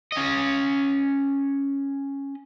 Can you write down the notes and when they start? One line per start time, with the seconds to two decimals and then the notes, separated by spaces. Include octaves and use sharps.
0.12 C#4 D#5